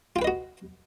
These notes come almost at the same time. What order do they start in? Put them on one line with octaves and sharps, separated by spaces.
F4 G5 B4 D#5 F#4